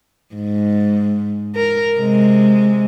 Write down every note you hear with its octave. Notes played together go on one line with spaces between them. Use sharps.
G#2
A#4
C3 G#3